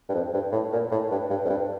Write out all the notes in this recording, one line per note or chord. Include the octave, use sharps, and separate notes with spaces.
G2
F2
G2
A2
A#2
A2
G2
G2
F2
G2